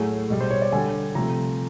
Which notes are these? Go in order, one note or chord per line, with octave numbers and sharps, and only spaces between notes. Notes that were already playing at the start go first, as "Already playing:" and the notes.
Already playing: A2 F#3 A3 G#4
B2 G3
C5
C#5
D5
D3 G3 G#5
C3 F3 A3 A#5